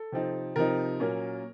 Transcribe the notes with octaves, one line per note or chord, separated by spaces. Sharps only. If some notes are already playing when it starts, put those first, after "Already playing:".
Already playing: A4
C3 F3 C4 D#4
C3 F3 C4 D#4 A#4
A#2 F#3 A#3 C#4